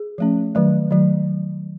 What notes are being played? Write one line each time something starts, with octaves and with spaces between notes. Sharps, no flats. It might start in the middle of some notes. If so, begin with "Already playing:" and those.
Already playing: G#4
F3 A3 C#4
D#3 F#3 A3
D#3 F#3 A3